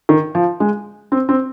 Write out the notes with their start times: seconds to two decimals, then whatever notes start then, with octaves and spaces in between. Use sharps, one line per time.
0.09 D#3
0.35 F3
0.60 G#3
1.12 C4
1.29 C4